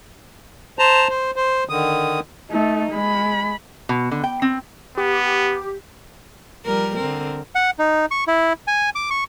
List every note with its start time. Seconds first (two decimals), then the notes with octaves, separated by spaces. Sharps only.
0.79 C5 A5 A#5
1.09 C5
1.36 C5
1.69 D3 D#3 D#6
2.50 A3 D#4
2.92 G#3 B5
3.89 B2
4.11 D3
4.24 G5
4.42 C4
4.97 B3 G4
6.65 F3 G3 A#4
6.96 D3 C4 A#4
7.55 F#5
7.79 D#4
8.11 C#6
8.27 E4
8.67 G#5
8.95 D6
9.10 C#6